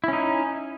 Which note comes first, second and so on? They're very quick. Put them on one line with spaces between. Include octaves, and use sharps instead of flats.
E4 C#4 D#4